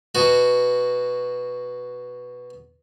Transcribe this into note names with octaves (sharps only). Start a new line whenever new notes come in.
B2 F#4